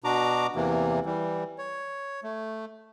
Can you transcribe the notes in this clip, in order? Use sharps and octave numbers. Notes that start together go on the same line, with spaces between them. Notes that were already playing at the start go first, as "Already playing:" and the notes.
B2 D4 F#4 A#5 D6
E2 C3 E3 A#3
E3 G3
C#5
A3